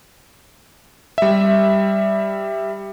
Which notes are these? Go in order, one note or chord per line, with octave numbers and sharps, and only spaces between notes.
G3 E5